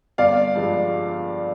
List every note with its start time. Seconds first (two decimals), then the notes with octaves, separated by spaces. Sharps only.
0.18 G1 D5 F5
0.55 G2 F3 G#3